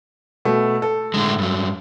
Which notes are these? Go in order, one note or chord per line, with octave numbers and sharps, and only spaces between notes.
B2 A3
A4
A2 D3 G#3
G2 F#3